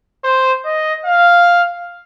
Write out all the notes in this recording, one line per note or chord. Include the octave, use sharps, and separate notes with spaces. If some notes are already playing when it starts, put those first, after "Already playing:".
C5
D#5
F5